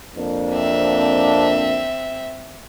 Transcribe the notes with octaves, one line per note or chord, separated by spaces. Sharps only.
F2 A#3 D4
C4 E5